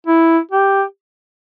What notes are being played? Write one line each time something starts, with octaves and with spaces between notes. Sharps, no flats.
E4
G4